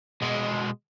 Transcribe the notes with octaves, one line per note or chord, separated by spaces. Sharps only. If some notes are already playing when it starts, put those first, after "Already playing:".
B2 G#3